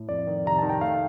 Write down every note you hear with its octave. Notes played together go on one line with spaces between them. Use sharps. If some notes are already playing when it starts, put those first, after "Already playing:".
Already playing: A2
F2 D5
D#3
C3 A#5
D#3 A5
G5
A3 F5